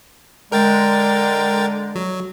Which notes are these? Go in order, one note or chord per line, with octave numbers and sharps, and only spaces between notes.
D3 G#3 A#4 G5 A6
F#3